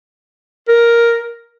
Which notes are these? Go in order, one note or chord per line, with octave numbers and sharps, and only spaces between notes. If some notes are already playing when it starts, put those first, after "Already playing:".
A#4